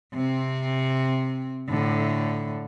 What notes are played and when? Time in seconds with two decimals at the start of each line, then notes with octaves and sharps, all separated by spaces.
0.14 C3 C4
1.70 A2 D3